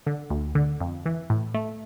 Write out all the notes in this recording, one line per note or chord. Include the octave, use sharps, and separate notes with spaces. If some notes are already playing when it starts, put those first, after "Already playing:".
D3
D2
D3
F2
E3
A2
A3